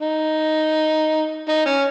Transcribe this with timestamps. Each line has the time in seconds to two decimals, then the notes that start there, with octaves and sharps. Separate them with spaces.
0.01 D#4
1.48 D#4
1.66 C#4